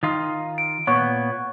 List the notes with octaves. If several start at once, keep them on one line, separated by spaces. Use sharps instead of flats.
D#3 D#4 F4
D7
A#2 B3 C#5 C#6